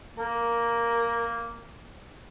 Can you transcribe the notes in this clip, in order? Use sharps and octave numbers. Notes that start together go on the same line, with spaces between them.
A#3 A#4